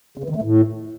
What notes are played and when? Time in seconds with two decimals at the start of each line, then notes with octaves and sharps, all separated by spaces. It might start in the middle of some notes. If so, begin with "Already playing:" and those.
0.18 C#3
0.24 E3
0.30 D#3
0.36 A3
0.42 A2